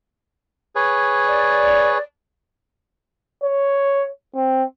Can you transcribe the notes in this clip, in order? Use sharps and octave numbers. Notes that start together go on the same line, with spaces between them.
G#4 B4 C#5
D5
C#5
C4